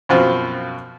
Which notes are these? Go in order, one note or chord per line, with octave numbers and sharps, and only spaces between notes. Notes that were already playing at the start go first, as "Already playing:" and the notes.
F#2 B2 F3 C4 F4 F#4